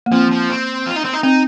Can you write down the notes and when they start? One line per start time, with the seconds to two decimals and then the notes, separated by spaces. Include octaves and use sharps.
0.06 A#3
0.12 F3 C4
0.31 F3
0.50 C4
0.86 F4
0.96 D#4
1.04 C4
1.13 D#4
1.23 C4 D#4